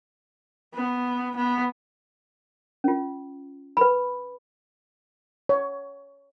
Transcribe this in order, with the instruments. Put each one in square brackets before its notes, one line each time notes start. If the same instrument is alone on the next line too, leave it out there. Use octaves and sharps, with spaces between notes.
[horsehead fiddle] B3
B3
[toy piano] C#4 F4
B4 B5
[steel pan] C#5